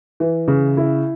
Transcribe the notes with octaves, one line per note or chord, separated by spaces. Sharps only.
E3
C#3
E4